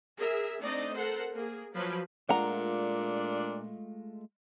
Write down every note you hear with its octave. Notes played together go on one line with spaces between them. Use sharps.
G#4 A#4 E5
A3 C4 D4 D#4 D5 D#5
A4 A#4 C5 F#5
A#3 G#4
F3 F#3 B4
A#2 G#3 A3 D4 F4 F#5 A#5